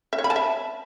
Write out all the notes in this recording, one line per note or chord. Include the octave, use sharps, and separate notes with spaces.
E5
C#5
B5
A5
E5